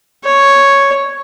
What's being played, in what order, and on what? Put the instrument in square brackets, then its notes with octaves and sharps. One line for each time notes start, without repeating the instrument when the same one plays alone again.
[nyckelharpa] C#5